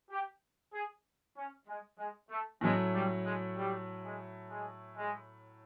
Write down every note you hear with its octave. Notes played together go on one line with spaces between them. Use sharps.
G4
G#4
C#4
G#3
G#3
A3
A2 F#3 G#3 A3 C#4
G3
G#3
G3
G#3
G#3
G#3